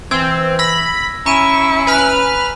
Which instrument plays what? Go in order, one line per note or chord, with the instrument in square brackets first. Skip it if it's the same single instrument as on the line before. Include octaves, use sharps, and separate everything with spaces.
[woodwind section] E3 [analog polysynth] C4 [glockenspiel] E6 G#6
[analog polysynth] B5 [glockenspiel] E6 A#6
[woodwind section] C#4 [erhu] E4 [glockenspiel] A#5 D#7 E7 [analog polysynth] C#6
[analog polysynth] B4 F6 [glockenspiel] G#5